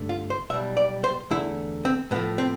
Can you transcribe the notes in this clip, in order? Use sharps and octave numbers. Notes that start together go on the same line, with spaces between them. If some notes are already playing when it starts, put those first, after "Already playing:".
Already playing: G2 D3 A3
F4
C5
B1 B2 G3 E5
D5
C5
E2 D3 A3 E4
C4
A2 F3 A3 B3
C4